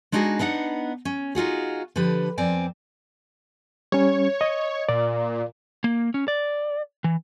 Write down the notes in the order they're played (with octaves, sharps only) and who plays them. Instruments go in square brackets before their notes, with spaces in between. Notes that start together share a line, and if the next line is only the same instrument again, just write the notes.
[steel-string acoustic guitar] G#3 D4 D#4 F#4 G#4
B3 D4 D#4 F#5
C#4
D#4 F4 F#4 G#4
D3 F3 G4 B4
F2 C4 D5 G#5
[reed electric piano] G3 C#4 [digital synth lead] C#5
[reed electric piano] D#5
[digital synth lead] A#2 [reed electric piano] D5
[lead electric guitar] A#3
C#4
D5
E3